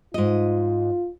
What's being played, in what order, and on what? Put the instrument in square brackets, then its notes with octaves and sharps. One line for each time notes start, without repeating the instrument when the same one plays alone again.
[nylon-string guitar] G#2 D#5 [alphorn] F4